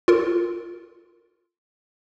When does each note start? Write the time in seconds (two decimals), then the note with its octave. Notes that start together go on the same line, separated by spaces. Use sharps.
0.08 F4 A4 A#4